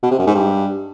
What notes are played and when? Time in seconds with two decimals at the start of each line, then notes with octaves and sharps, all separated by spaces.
0.03 B2
0.11 C3
0.19 F#2
0.27 G#2
0.35 G2